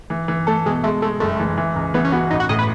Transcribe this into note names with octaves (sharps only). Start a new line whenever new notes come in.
E3
E3
A3 A4
B2 G#3
G#3 A3
G#3 A3
F#1 A3
E3
E3
C#2
E3 B3
C#4
B3 F#4
A1 D#4
F#4
A2 D#5
B4